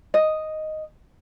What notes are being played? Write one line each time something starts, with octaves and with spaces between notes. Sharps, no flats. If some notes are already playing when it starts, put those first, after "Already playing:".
D#5